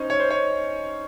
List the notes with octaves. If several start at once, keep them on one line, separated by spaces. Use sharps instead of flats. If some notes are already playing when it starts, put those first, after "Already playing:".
Already playing: C#4 D#4 C5
C#5
C5
C#5